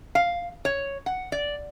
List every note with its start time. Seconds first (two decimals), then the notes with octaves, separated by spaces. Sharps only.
0.15 F5
0.65 C#5
1.06 F#5
1.32 D5